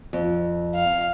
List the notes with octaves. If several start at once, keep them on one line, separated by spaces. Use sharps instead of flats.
F2
F5